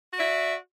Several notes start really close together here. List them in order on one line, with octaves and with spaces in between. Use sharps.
F#4 D5 E5